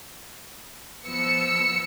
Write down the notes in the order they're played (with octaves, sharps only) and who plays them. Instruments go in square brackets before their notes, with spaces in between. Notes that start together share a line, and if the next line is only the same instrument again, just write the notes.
[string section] F3 B3 E6 C#7